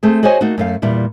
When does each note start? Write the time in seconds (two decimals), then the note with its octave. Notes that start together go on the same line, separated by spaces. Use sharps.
0.03 A3 C4 G#4
0.23 F#4 G#4 C5 C#5 D#5 G#5
0.41 A3 A#3 D#4 F#4
0.58 F#2 A3 F5
0.82 E2 A#2 G3 E4